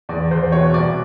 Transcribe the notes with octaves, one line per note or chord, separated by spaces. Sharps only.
E2 D5
E2 C5
B2 C#5
C2 D5